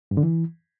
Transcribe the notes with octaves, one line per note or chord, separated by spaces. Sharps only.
G2
D3
E3